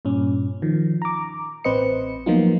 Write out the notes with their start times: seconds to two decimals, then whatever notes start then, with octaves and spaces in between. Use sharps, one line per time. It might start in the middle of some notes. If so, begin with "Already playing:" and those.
0.05 G2 A#2 C#4
0.62 D#3 F3
1.02 A#5 D6
1.64 A1 C4 B4 C5 D#5 C#7
2.26 F3 F#3 A#3 B3 D#4 F4